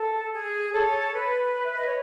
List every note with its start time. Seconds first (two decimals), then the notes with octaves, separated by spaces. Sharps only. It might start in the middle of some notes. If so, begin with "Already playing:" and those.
Already playing: A4
0.33 G#4
0.73 A4 C#5
1.14 B4
1.64 E5
1.75 D#5
1.85 C#5